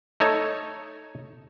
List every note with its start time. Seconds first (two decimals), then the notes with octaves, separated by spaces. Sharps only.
0.20 A3 D#4 A4 C#5